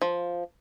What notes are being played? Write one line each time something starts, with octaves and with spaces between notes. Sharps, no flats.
F3